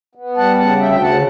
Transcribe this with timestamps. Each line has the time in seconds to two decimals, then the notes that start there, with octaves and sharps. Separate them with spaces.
0.15 B3
0.37 G3 F#5 A5
0.58 C#3 F#5 A5
0.80 D2 E5 G5
0.91 G5
1.02 C#3 F#5 A5